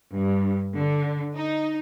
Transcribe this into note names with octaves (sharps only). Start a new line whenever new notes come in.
G2
D3
D#4